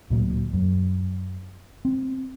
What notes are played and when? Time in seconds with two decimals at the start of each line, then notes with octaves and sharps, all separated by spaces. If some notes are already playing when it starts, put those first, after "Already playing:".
0.10 D1 D2 A#2 F#3
0.53 F#2
1.85 C4